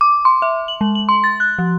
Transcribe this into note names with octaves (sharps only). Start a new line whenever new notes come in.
D6
C6
E5
F#7
G#3
F#7
C6
A6
F#6
F3